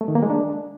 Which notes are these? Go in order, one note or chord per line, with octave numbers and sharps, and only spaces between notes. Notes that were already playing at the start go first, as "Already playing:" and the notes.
A3
D#3
A#3
G#3
D4